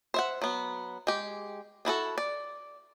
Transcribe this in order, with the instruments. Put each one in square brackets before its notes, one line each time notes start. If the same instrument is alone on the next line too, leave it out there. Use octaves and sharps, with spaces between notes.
[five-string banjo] C5 E5 F#5
F#3 B3
G#3 G4
D4 E4 F#4 A4
D5